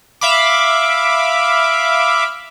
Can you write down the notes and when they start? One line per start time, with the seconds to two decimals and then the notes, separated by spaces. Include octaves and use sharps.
0.21 E5 F5 B5 D6